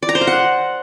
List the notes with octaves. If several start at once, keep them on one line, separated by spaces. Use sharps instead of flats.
D5
A#5
C5
F5
F#5